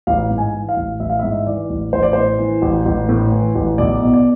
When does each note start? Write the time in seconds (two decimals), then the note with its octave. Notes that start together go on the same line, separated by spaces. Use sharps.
0.07 A1 F5
0.30 G#2
0.38 G#5
0.54 E3
0.69 F5
0.77 A1
1.00 A1 E5
1.10 F5
1.19 G#2 E5
1.47 E3 D5
1.70 A1
1.93 A1 C5
2.03 D5
2.13 A2 C5
2.39 E3
2.62 A1
2.86 A1
3.09 A2
3.32 E3
3.55 A1
3.78 B1 D5
4.02 B2
4.14 D5